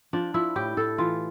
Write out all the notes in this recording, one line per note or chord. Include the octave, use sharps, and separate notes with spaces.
F3 D4
F3 E4
A2 G4
A2 A4
E3 F4